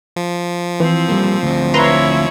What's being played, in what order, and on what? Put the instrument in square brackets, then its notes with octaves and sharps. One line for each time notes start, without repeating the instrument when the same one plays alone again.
[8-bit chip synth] F3
[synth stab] E3 [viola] C4
[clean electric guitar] G3 A#3
D2 C4
[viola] E4 C#5 [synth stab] B4 A#5 C6